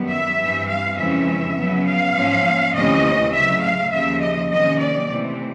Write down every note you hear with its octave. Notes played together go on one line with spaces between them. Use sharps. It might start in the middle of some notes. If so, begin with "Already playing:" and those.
Already playing: F#2 D#3 G3 B3
E5
G2 E3 G3 C4
F5
F2 C#3 E3 G#3 C#4 E5
C#3 F#3 B3
F5
G#2 F3 A#3 C#4
D2 C3 E3 A3 C#4 D#5
C#3 F#3 A3 E5
F5
D#2 C#3 F3 E5
D#5
C3 D#3 F#3 A#3 C#4 D#5
D5
C3 E3 A3 C4